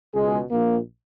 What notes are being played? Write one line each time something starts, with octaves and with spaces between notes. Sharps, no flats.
C#2 B2 G#3
A#1 A#2 A#3